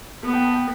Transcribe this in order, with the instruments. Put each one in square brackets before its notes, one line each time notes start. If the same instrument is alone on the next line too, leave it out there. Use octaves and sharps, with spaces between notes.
[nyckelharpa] B3 [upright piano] A4
[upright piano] G5
A5
G5